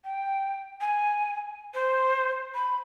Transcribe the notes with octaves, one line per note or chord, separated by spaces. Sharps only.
G5
G#5
C5
B5